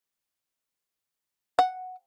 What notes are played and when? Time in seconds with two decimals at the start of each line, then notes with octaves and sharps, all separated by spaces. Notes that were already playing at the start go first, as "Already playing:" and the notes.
1.59 F#5